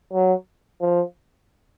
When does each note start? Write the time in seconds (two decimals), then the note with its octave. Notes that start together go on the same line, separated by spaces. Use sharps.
0.13 F#3
0.81 F3